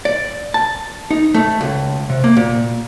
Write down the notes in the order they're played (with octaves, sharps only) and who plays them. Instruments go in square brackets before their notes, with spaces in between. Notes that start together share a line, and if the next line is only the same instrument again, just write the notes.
[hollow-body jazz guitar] D5
A5
D#4
A3
C#2
C3
A#3
A#2